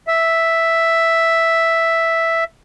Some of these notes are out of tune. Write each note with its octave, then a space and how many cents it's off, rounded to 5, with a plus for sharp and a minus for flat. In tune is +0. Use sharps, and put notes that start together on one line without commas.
E5 +0